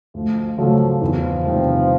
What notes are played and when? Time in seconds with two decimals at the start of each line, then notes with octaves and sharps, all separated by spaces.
0.14 D2 F3
0.58 C#3 F3 F#3 A3
1.02 E2 F3
1.44 C3 D#3 G3 C4